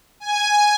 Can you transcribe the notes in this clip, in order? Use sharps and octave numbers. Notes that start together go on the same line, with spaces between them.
G#5